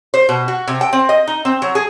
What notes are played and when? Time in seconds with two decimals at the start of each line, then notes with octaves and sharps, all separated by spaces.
0.14 C5
0.29 B2
0.48 F#4
0.68 C3
0.81 G5
0.93 C4
1.09 D#5
1.28 D#4
1.45 C4
1.62 F#3
1.75 G#4